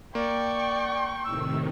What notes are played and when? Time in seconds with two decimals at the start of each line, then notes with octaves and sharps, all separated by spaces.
0.15 A#3 D5 G5 C#6
1.25 A2 C3 D#3 E6